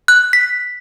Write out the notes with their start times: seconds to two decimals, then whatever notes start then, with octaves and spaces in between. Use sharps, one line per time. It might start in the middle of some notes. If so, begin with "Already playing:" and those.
0.08 F#6
0.33 B6